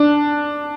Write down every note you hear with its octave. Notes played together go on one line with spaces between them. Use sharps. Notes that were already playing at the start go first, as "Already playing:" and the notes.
Already playing: D4